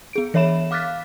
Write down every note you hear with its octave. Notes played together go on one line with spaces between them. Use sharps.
B3 G#4 D7
E3 C#5 E5 B5 E7
F5 D6 F6 F#6 A6 B6